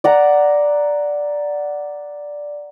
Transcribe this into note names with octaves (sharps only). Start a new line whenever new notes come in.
D5 F#5 A#5